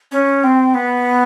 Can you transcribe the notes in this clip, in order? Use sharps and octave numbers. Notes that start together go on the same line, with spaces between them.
C#4
C4
B3